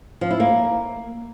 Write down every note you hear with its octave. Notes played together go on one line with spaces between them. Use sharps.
F3
E4
A#3